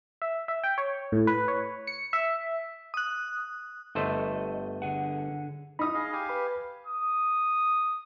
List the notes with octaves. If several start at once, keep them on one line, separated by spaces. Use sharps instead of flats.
E5
E5
G5
C#5
A2
B4
C#5
C#7
E5
D#6 F#6
G1 A3 C5 D#5
D3 G#4 F#5
D#4 B5 D#6
G#4 D#5 F5
G4 F5 G#5
B4 B5
D#6